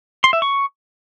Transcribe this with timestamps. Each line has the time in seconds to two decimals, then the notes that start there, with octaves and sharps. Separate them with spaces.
0.24 C6
0.33 E5
0.42 C#6